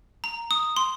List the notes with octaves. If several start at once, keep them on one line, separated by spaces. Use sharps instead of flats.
A#5
D#6
C6